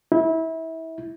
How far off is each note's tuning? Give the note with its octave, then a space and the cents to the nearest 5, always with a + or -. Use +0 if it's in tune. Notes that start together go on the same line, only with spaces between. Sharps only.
E4 -25